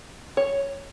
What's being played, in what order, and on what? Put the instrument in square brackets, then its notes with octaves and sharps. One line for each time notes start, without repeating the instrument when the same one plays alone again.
[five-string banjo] C#5